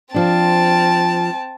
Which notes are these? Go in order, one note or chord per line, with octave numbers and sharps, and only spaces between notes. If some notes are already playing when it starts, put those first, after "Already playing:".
F3 C4 D4 A5